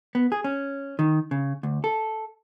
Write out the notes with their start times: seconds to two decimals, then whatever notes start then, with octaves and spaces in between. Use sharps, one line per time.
0.15 B3
0.32 G#4
0.44 C#4
0.99 D#3
1.31 C#3
1.63 D2
1.84 A4